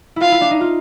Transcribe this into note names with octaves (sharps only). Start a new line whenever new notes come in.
E4 F4 F5
E4
D4
D#4
F4